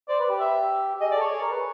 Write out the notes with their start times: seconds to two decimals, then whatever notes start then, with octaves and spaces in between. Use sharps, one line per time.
0.09 C5 D5
0.19 B4
0.29 G4
0.40 E5
1.00 G#4 D#5
1.11 D5
1.15 A4
1.20 C#5
1.31 G#4
1.41 A#4
1.51 B4